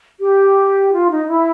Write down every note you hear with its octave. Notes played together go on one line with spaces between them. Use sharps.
G4
F4
D#4
E4